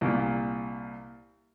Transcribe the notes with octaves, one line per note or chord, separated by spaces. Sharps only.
C2 A#2